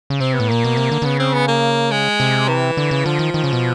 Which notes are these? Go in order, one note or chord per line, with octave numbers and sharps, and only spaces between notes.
C#3
C3 C4
B3
A2
A#2 A#3
B2
C3
D3
D3
C#3 B3
C4
B3
A#3
G#3
C3
E3
D3
C#3
D3 F3
D#3
D#3
C#3
B2